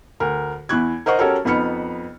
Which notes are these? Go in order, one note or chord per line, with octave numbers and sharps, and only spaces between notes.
D2 A#4
E2 E4 C#6 F#6 G#6
A#4 C5 D#5 F#5 C#6
C#4 F#4 G4 A4 A#4 C#5
F2 B3 D#4 B5 F6 C#7